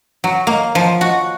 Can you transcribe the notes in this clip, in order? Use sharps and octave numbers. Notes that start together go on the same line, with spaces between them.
F#3
A#3
F3
F#4